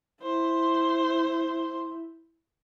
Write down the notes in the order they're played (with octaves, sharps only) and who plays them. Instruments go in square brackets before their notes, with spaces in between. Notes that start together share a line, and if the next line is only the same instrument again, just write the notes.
[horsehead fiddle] E4 [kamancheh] C5